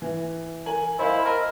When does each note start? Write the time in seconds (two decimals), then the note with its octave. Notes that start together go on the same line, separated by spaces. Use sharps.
0.02 E3
0.66 A#4 G#5 F#7
0.99 E4 A#4 C5 D#5 F5 G#5
1.25 A#4 D#5 A5 B5